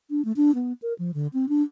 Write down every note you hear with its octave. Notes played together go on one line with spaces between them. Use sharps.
D4
A3
D4
B3
A#4
F3
D3
C4
D4